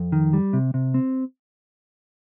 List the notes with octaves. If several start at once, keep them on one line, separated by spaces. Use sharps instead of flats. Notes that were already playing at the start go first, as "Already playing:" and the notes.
Already playing: F2
D#3
G3
C3
C3
C4